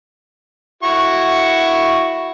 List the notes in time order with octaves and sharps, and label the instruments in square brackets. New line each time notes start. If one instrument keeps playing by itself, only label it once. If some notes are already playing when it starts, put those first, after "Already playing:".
[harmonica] E4 F#4 C#6